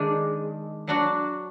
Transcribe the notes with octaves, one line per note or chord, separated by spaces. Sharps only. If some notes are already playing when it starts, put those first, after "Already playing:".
Already playing: D#3 G#3 D4
F#3 D4 F#4